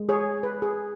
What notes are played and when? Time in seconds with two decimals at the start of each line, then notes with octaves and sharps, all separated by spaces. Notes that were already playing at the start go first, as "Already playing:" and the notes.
Already playing: G#3
0.09 G#4 C#5
0.43 B4
0.62 G#4